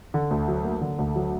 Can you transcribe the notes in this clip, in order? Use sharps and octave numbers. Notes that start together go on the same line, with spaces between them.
D3
D2
F#3
A#3
D3
D2
F#3